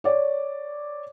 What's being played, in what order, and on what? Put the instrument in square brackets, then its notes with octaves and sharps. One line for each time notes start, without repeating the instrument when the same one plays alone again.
[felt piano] C#5 D5